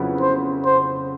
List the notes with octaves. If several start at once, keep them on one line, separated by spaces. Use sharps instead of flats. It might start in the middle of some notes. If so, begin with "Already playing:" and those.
Already playing: F2 C#3 F#3 B3 E4
C5
C5